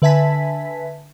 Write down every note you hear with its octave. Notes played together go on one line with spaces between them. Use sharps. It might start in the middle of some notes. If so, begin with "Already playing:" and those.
D3 B4 E5 G#5 A5 B6